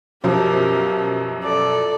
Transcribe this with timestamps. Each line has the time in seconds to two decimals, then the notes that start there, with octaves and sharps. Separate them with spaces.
0.24 F#2 B2 F3 G4 A#4
1.43 A4 D5